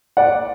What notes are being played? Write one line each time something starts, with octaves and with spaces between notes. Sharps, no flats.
D5 F#5